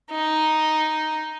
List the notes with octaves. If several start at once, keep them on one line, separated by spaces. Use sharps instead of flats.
D#4